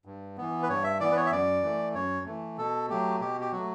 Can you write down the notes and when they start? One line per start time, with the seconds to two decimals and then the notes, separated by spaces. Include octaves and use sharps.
0.05 G2
0.38 E3 B3
0.63 B4
0.69 G2 C#5
0.84 E5
1.00 E3 B3 D5
1.11 B4
1.17 C#5
1.26 E5
1.32 F#2 D5
1.63 E3 A3
1.94 F#2 C#5
2.26 E3 A3
2.58 B2 A4
2.89 F#3 A3 G4
3.20 B2 G4
3.41 G4
3.52 F#3 F#4
3.57 A3